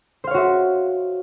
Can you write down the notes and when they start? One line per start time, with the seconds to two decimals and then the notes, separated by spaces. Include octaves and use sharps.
0.24 C5
0.27 F5
0.31 C#5
0.34 F#4
0.38 E5